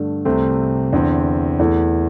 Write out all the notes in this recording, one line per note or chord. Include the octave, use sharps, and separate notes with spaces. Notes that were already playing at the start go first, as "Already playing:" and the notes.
Already playing: G2 D3 A3
C2 C3 A3 C4
E2 D3 C4
E2 E3 A3